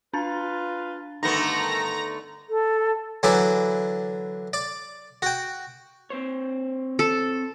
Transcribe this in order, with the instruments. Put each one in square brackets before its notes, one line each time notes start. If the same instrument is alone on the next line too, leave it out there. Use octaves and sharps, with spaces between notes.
[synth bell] D4 A5 A6 [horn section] F4 B4
[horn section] G2 D#3 [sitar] D3 A3 B3 [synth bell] D#4 [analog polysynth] A#5 A#6
[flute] A4
[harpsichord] D3 E3 F#3 E4 D5
D5
F#4 G5
[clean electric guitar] C4 C5 C#5
[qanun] A4